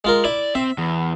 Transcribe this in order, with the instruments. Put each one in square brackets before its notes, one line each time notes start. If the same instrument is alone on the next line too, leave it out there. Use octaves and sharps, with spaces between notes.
[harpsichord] G#3 F4 A#4
[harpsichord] E4 [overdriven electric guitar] D5
[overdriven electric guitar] C4 [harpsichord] E5
[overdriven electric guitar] E2